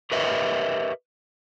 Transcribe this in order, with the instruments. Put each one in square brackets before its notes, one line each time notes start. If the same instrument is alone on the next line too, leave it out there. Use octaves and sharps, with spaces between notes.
[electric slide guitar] G4 A#4 B4 C#5 D#5 E5